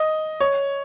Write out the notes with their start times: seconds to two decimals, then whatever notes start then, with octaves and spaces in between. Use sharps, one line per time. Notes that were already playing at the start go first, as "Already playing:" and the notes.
Already playing: D#5
0.40 C#5